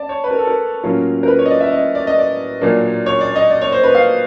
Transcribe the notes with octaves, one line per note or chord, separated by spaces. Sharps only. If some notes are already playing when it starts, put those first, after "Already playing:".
Already playing: D5 A5
C#5
B4
A#4
A4
A#4
A2 F#3 A#3 C#4 F4
A#4
B4
C#5
D#5
D5
E5
D#5
D5
D#5
D5
A#2 F#3 A#3 D4
C#5
D5
D#5
D5
C#5
C5
B4
F5